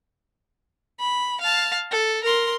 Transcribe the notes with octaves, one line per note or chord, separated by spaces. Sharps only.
B5
F5 A5
A4
A#4 C6